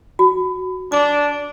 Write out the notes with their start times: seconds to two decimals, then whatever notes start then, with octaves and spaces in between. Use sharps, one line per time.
0.19 F#4
0.92 D4 D6